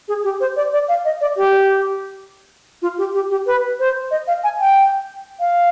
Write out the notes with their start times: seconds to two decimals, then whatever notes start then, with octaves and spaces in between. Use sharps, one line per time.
0.08 G#4
0.24 G4
0.40 C5
0.56 D5
0.73 D5
0.89 F5
1.05 D#5
1.21 D5
1.37 G4
2.82 F4
2.98 G4
3.14 G4
3.31 G4
3.47 B4
3.79 C5
4.11 D#5
4.27 F5
4.44 G#5
4.60 G5
5.40 F5